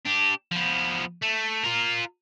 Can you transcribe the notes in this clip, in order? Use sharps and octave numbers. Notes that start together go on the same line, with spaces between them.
D4 G4
F3 B3
A3
F4 A#4